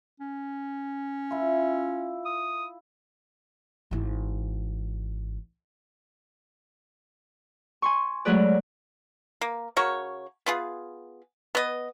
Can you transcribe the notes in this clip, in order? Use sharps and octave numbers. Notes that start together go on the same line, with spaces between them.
C#4
E4 F4
D#6
G#1 E3
G#5 C6 C#6
F#3 G#3 A3 G#4 B4 D5
A#3
C#3 F#4 A#4 C#5
B3 F4 G#4
B3 D#5